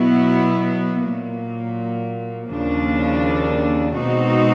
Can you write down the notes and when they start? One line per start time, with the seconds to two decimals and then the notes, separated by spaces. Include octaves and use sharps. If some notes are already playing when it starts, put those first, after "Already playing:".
Already playing: B2 F#3 B3 E4
1.06 A#2 F#3 A#3
2.51 D#2 C#3 F3 A#3 D4
3.97 B2 G#3 C4 D#4 F#4